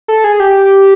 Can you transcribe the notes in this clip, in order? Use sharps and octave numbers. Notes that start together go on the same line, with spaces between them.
A4
G#4
G4